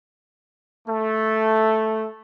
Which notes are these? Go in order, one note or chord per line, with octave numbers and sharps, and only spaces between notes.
A3